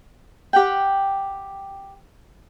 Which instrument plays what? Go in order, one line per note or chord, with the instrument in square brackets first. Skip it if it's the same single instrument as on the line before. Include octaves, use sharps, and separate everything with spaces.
[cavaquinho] G4 F#5 G5